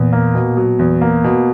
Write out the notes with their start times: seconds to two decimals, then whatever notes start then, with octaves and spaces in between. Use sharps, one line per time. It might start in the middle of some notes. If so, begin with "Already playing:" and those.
Already playing: E2 A#2
0.13 A#3
0.35 B2
0.57 F#3
0.79 E2
1.01 A#3
1.24 B2